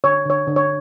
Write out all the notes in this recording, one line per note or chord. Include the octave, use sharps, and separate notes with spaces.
D3 C#5
D3 C#5
D3
C#5